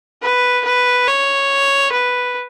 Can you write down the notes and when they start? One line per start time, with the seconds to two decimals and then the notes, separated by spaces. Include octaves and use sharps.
0.23 B4
0.65 B4
1.07 C#5
1.92 B4